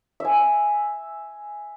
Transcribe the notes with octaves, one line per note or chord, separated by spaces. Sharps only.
E5 G#5